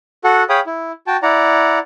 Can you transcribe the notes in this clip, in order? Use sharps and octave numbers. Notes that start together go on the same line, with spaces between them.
F#4 A4 F#5
G#4 C#5 F5 G5 B5 D#6
E4
F#4 G5 A5
E4 D5 F#5 A#5